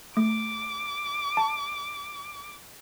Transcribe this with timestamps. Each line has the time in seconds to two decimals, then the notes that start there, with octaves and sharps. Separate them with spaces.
0.17 A3 D6
1.37 A5